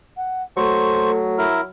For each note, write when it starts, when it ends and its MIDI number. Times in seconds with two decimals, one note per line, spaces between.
0.17 0.43 78
0.57 1.70 54
0.57 1.45 57
0.57 1.11 72
0.57 1.11 85
1.38 1.61 64
1.38 1.61 70